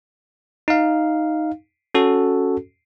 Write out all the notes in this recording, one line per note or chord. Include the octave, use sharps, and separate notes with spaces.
D#4 F5
C#4 F#4 A4